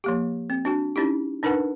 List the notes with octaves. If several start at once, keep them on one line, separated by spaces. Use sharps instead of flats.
F3 A#3 G4
C4
D4 F#4 G#5
C#4 D#4 E4 G4
D4 D#4 A#4 B4 F#5 G#5